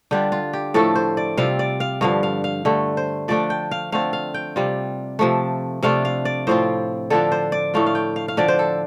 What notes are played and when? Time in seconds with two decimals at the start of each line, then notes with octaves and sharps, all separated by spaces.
0.11 D3 G3 D4 F4 G4
0.32 F4
0.53 G4
0.74 A2 F3 A3 A4
0.95 C5
1.17 D5
1.37 C3 G3 C4 F4 F5
1.59 D5
1.80 F5
2.01 G2 D3 F3 F5
2.23 F5
2.44 F5
2.65 G2 D3 A3
2.97 C5
3.28 F3 A3 D4 D5
3.50 G5
3.71 F5
3.92 D3 A3 C4 F4 F5
4.13 F5
4.34 G5
4.56 C3 G3 F4
5.19 C3 F3 A3
5.83 C3 A3 D4 F4 F5
6.05 F5
6.25 D5
6.47 A2 F3 C4 F4 C5
7.10 D3 F3 D4 F4 A4
7.32 C5
7.52 D5
7.74 A2 A3 F4 F5
7.86 F5
7.95 G5
8.16 F5
8.28 F5
8.37 D3 F3 D4 D5
8.48 C5
8.59 A4